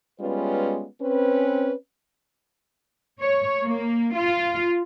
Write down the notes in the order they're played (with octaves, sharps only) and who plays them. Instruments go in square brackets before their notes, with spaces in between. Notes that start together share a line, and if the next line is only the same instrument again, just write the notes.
[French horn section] G3 G#3 B3 C#4 F4 B4
C4 C#4 B4
[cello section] C#5
A#3
F4